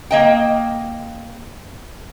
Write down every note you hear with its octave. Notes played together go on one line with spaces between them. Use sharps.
A#3 D#5 G5